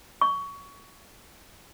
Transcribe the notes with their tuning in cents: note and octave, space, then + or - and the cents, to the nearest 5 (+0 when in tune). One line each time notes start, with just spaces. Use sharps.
C#6 +20